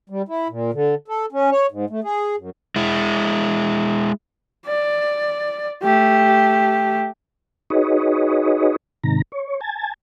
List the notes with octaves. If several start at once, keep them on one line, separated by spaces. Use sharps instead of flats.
G3
E4
A#2
D3
A4
C#4
C#5
G#2
A3
G#4
F#2
G#3 E4
D5
A3 G4
D#4 F#4 G#4 B4 C#5 D#5
G#2 C3 D#3 A#5
C#5
G#5 A5